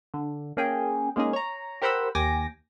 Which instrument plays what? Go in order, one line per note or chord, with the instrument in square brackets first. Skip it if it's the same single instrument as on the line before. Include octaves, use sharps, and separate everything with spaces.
[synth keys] D3
A#3 C#4 G#4 G5 G#5
G#3 A#3 C#4 D#4 G#4
C#5 A#5
G4 A#4 C5 F#5 B5 E6
D#2 G5 G#5 D6 A#6